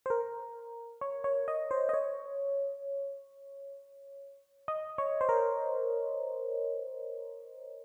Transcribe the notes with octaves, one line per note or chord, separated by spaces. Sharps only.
C5
A#4
C#5
C#5
D#5
C5
D#5
C#5
D#5
C#5
C5
A#4